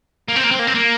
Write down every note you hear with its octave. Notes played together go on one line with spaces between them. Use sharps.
A#3
C4
A#3
C4
A#3
C4
A#3